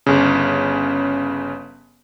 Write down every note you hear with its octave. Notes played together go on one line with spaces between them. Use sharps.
G1 C#3